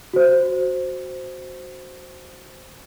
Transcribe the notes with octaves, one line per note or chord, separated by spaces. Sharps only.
F#4 C5